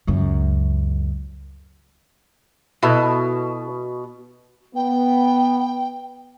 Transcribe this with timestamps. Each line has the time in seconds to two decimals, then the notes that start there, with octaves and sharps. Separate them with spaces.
0.07 C#2 F#2
2.83 B2 E4 A4 B4
4.75 B3 G5